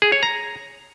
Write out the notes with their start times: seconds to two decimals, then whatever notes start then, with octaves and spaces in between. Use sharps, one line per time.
0.02 G#4
0.12 C#5
0.23 A#5